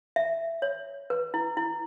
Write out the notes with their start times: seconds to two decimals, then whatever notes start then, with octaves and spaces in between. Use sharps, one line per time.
0.16 E5
0.62 C#5
1.10 B4
1.34 E4
1.57 E4